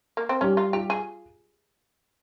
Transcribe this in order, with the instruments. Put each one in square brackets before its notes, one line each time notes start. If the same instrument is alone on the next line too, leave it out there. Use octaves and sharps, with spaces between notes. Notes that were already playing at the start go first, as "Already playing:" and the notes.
[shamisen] A#3
C4
[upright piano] G3 [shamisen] C#4
[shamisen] F4
[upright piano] F4 [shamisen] G4
[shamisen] G#4